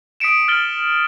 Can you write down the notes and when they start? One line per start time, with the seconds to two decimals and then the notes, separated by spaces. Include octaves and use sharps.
0.20 D#6 B6 C#7 D7 E7
0.48 F6 A6 D7 F#7 G7